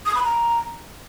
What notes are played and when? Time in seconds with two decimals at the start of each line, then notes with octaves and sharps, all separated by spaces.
0.06 D#6
0.15 B5
0.24 A#5